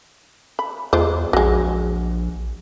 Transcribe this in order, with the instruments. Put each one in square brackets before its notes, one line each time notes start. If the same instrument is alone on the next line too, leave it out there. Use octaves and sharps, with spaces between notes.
[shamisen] B5
[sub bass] E2 [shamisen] G#3 F4 C5
[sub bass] A#1 [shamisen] F#3 G#3